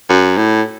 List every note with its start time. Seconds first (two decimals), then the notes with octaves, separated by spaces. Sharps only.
0.10 F#2
0.37 A2